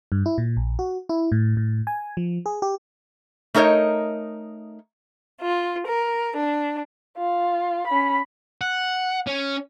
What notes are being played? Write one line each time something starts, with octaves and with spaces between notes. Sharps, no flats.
G2
E4
A#2
A#1
F#4
E4
A2
A2
G#5
F3
G#4
G4
A3 D#4 A#4 C#5 D#5
F4
A#4
D4
F4
C#4 B5
F#5
C#4